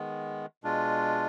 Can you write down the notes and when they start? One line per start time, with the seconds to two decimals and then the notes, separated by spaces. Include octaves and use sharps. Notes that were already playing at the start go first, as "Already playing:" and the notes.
Already playing: D#3 G#3 B3
0.63 B2 G#3 D4 F4